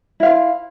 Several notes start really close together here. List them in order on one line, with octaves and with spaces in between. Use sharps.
E4 F5 C5